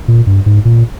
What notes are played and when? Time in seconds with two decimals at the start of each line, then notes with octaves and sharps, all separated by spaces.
0.08 A#2
0.27 G2
0.46 G#2
0.65 A#2